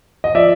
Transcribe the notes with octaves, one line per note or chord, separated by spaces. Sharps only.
D#5
F3 D5 E5